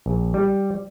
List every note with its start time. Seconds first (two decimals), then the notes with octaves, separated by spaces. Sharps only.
0.06 A#1
0.34 G3